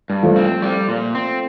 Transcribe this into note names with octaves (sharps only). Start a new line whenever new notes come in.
G2
F3 A3
C4
G3
A#2
C4